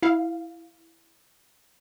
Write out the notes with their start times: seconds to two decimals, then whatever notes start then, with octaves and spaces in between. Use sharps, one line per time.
0.02 E4 F5